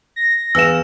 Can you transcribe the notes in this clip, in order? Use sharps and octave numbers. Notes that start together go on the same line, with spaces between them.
A#6
E2 F5 E6 E7